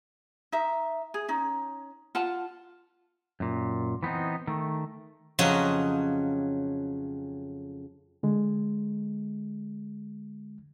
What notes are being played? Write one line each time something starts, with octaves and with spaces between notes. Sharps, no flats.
D#4 E5
G#4
C#4 D#4
F4 F#5 A5
F#2 A#2
E3 B3 C4 D#4
D#3 A3
F2 C#3 F#3 D#5 A#5
D3 G#3